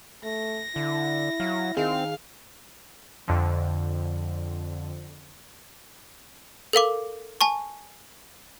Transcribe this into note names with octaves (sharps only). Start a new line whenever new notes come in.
A3 A#6
D3 E4
F#3 F5
D#3 C4 D#4 G#4 F5
F2 D3 F3
A4 A#4 F5 D6
G#5 A5 C#6